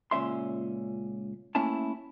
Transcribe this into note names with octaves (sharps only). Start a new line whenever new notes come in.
C#2 A#2 C#4 E5 C6
A3 A#3 C#4 E4 G#5 A5